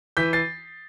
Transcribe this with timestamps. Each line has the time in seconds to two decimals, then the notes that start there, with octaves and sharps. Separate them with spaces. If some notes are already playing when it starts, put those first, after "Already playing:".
0.17 E3 G6 B6
0.33 A6 C7